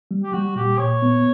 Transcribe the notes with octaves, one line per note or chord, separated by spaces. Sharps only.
G3
G4
G3 F#4
A#2 G4
A#2 C#5
B3